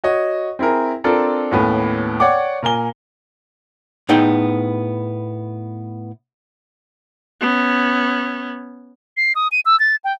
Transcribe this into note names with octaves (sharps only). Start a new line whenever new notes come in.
F#4 C#5 D#5
C4 E4 G#4 A#4
C4 D4 F4 A4 A#4
D#2 A2 B3 C#4
C#5 D5 F#5 G5 D6
A#2 A#4 G#5 G7
A2 B3 D#4 G#4 G5
B3 C#4
C7
D#6
D#7
E6
A6
G5